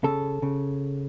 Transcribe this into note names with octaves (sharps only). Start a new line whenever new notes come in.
C#3 A4
C#3